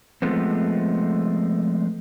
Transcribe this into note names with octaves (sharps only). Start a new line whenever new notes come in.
F3 G#3 A3 B3 C4